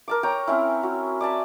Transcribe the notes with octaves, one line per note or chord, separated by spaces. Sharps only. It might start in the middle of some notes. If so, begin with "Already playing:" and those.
A#4 A5 D6
C#5 G5 A#5
C4 C#4 E4
F#4
D5 G#5 A5 B5